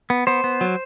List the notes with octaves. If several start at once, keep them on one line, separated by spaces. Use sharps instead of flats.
B3
B3 C5
B3
F#3